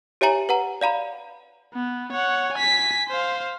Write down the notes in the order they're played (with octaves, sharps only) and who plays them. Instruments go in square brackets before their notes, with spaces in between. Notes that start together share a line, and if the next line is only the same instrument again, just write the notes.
[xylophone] G4 C#5 E5 G#5 A#5 F#7
B4 F#5 A#5
D5 F5 A#5 B5
[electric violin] B3
C#5 F#5
G#5 B6
C5 F5